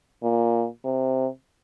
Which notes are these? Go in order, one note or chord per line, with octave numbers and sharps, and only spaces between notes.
A#2
C3